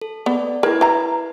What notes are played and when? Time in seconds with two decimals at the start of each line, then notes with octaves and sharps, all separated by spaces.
0.01 A4
0.26 B3 D5
0.63 E4 A#4 B4 G#6
0.81 E4 B4 A#5